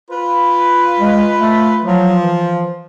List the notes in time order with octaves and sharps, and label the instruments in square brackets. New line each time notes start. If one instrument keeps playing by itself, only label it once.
[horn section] F4 B4
[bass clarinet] G#3
A3
[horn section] F3 [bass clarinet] F#3
[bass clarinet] E3